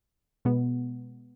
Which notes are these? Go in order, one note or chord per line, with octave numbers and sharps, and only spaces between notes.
B2 G#3 B3